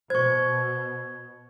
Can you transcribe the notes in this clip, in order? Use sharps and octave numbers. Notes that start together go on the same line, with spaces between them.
B2 C5 C#6 G#6